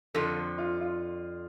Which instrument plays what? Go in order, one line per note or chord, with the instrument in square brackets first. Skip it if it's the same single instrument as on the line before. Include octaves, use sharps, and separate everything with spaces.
[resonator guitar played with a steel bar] F2 D3 F3 [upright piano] A4
[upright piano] F4
F4